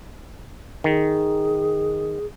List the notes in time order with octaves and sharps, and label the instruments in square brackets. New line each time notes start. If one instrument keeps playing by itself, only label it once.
[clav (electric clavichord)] D#3 [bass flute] G#4